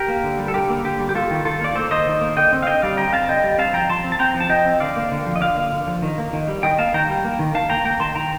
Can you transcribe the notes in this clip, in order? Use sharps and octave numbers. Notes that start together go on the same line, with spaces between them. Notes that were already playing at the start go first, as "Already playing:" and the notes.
Already playing: G4 A#4
A#3
D3
G3
A4
D3 G4 A#4
A#3
D3 G4
G3
G4
A#3 F4 A4
D#3
D#3 F4 A4
A#3 D5
A#3 A4 C5
D#3 C5 D#5
D#3
A#3
D3 D#5 G5
C4
F5
D3 D#5 G5
G3 D5 F5
D3 G5 A#5
C4 F5 A5
D3 D#5 G5
G3
C4 F5 A5
F3 G5 A#5
F3 A5 C6
C4
A5
C4 G5 A#5
F3
A5
F3 D#5 G5
C4
D3 D5 F5
A#3
D3
F3
D#5
D3 D5 F5
A#3
D3
F3
D#3
A#3
D#3
G3
D#3 D#5 G5
A#3 F5 A5
D#3 G5 A#5
G3
A#3
D#3
D#3 F5 A5
A#3 G5 A#5
A#3 G5 A#5
D#3 A5 C6
D#3 G5 A#5